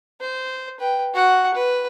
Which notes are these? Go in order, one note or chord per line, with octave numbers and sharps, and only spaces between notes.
C5
B4 G5
F#4 F#5
B4